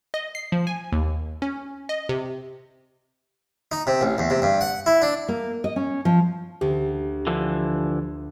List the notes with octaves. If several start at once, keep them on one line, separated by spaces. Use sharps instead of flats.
D#5
C7
F3
G#5
D#2
C#4
D#5
C3
D#4
C3
A1
E2
C3
G2
F#5
E4
D4
A#3
D#5
C#4
F3
D2 G4
D3 E3 F3